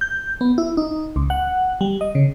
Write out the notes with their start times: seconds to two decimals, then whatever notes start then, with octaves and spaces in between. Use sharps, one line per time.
0.01 G6
0.41 B3
0.58 E4
0.77 D#4
1.16 C#2
1.30 F#5
1.81 G3
2.01 D#5
2.15 C#3